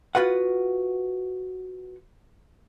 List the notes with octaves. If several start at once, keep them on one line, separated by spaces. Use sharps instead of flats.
F4 F#4 B4 F#5